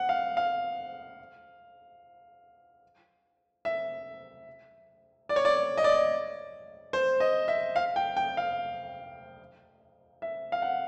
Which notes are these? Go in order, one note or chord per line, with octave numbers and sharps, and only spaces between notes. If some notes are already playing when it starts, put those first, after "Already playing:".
Already playing: F#5
F5
F5
E5
D5
C#5
D5
D#5
D5
C5
D#5
E5
F5
G5
G5
F5
E5
F5
F#5